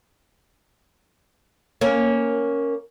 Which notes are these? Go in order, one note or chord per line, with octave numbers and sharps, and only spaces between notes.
A#3 C#4 A#4